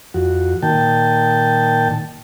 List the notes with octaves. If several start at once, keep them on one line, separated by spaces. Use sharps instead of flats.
F2 F#4
A#2 D#3 G5 A5